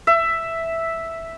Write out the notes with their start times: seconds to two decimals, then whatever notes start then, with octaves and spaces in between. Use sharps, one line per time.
0.07 E5